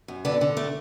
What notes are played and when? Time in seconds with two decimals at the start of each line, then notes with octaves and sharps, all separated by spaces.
0.08 F#2
0.25 D3 B3 D4
0.41 D3
0.57 A3